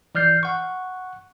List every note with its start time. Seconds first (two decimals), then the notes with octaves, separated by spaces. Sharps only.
0.15 E3 D5 F6 G6 C7
0.43 F#5 C#6